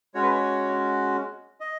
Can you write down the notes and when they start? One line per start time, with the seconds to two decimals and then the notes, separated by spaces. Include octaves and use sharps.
0.14 G#3 C#4 F#4 C#5
0.23 B4
0.30 C#5
1.60 D#5